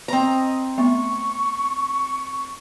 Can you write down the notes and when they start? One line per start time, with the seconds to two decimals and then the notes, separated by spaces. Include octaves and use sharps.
0.08 C4 D#5 A#5
0.78 A3 B3 C#6